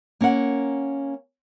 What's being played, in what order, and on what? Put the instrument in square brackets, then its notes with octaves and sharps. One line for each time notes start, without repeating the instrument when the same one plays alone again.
[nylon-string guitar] A#3 C#4 A#4 F#5